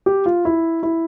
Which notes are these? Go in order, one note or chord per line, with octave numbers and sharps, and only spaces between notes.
G4
F4
E4
E4